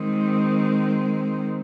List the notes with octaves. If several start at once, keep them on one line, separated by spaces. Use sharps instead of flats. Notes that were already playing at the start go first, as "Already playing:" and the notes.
Already playing: D#3 G#3 C4